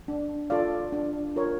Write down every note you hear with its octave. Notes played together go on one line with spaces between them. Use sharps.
D4
F4 A4 D5 F5
D4
F4 A#4 C#5